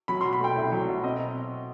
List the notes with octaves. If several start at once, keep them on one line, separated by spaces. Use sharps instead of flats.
F#3 B5
C6
B2
B5
A3 G5
C2 E5
F#3
B2
C4 D#5